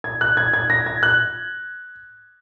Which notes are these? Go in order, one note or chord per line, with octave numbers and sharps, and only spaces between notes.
G#6
F#6
G#6
G#6
A#6
G#6
F#6